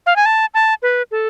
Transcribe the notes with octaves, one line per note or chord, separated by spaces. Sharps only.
F5
G#5
A5
A5
B4
A4